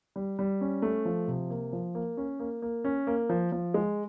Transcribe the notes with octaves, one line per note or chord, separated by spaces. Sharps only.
G3
G3
C#4
A3
F3
C3
A#3
F3
A#3
C#4
A#3
A#3
C#4
A#3
F3
F3
G#3